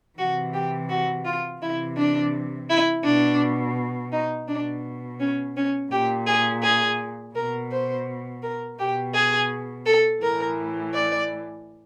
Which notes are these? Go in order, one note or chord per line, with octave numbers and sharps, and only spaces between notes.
C3 E3 F#4
G4
F#4
F4
C3 E3 E4
D4
E4
B2 D4
D#4
B2 D4
C#4
C#4
A#2 G4
G#4
G#4
B2 A#4
C5
A#4
B2 G4
G#4
A4
A2 E3 A#4
D5